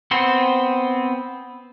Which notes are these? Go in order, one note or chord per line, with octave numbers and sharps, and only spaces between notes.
B3 C4 C5